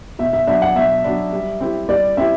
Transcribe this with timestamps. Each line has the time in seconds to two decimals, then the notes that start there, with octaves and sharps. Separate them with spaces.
0.19 B2 E5
0.33 E5
0.47 F#3 B3 D4 E5
0.62 F#5
0.75 B2 E5
1.04 F#3 B3 D4
1.32 G3
1.61 C4 E4 G4
1.89 G3 D5
2.17 C4 E4 G4 E5